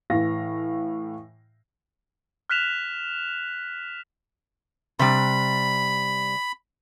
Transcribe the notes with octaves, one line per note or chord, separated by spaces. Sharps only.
A2 E3 F5 A#6
F6 F#6 B6 E7 F7
C3 G3 B5